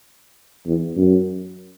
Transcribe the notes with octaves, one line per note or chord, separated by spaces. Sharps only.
E2
F#2